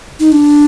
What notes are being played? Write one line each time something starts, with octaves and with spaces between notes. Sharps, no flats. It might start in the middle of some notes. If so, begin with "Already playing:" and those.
D#4
D4